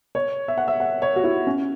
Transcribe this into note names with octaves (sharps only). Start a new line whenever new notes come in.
C#5
E5
F#5
E5
F#5
C#5
F#4
E4
C#4